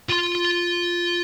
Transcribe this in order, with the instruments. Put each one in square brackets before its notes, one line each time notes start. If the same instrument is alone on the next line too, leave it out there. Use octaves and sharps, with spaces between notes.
[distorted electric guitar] F4 C6